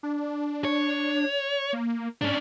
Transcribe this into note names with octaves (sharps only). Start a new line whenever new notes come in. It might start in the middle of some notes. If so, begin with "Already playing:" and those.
D4
C#5
A#3
G#2 C#4 D4